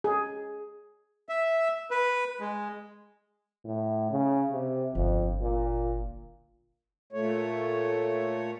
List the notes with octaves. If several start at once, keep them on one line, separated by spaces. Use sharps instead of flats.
G#4
E5
B4
G#3
A2
C#3
C3
G1 F2
A#2
A#2 A3 C#5